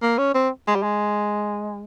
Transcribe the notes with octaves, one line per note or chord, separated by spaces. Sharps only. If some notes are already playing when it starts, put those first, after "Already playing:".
A#3
C#4
C4
G#3
G3
G#3